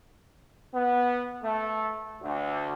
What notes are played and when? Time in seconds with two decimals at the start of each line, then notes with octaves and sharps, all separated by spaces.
0.72 B3
1.42 A3
2.21 D2